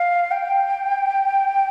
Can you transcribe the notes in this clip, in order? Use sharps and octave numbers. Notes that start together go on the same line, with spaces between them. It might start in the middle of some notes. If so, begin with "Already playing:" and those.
Already playing: F5
G5